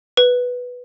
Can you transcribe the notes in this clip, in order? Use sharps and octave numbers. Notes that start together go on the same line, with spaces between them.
B4